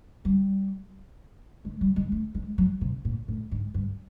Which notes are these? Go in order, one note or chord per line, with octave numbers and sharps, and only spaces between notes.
G3
G#3
G3
G#3
A3
G#3
F#3
C3
A#2
A2
G#2
G2